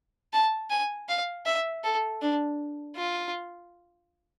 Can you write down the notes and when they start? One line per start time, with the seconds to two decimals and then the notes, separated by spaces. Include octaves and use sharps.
0.33 A5
0.70 G#5
1.08 F5
1.46 E5
1.84 A4
2.21 D4
2.96 F4